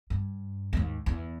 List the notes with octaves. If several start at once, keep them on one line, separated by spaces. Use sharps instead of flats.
G2
D#2 G#2
E2